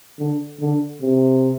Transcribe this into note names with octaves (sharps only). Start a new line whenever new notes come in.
D3
D3
C3